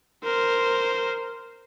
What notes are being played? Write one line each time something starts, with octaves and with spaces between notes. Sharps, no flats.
A#4 C5